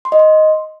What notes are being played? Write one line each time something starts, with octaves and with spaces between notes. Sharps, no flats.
C6
D#5
C6